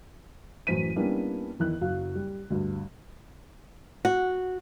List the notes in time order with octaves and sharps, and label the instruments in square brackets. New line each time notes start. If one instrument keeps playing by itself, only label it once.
[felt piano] F#2 A2 E3 C5 B6 D#7
G3 A#3 B3 C#4 D4 E4
E2 D#3 E4 F#6
F#1 F#3 F5
G3
D2 G2
[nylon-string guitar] F#4